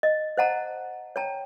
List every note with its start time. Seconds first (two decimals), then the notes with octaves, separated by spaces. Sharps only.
0.03 D#5
0.37 C5 D#5 F#5 A5 A#5
1.16 C#5 G5 A5 A#5